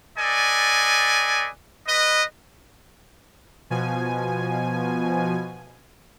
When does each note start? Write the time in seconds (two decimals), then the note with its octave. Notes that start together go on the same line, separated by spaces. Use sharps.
0.18 A4 B4 D5 D#5 G#5
1.87 B4 D#5
3.70 B2 F3 G#5